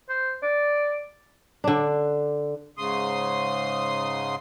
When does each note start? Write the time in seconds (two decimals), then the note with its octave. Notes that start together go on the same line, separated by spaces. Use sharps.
0.09 C5
0.43 D5
1.64 D3 D4
2.78 G#2 C#3 C6 D#6